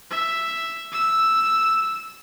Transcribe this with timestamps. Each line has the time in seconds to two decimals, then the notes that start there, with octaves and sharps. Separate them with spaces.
0.10 E5
0.92 E6